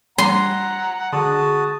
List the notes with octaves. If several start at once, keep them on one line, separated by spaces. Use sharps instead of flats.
G3 F#5 A#5 C6
D3 G#3 F#4 A5 D#6